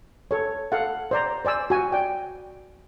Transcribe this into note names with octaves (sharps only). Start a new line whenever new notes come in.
A4 C#5
A4 F5 F#5
C5 D5 A#5
C5 D5 G#5 E6
F#4 G#5
D5 G5